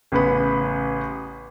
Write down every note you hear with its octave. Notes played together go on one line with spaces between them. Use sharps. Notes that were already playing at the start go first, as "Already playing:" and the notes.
A1 C#3 B3 B5